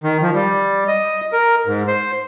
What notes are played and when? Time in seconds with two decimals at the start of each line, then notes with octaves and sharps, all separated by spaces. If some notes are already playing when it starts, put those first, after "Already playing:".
0.04 D#3
0.22 F3
0.34 G3
0.88 D#5
1.33 A#4
1.67 G#2
1.88 C5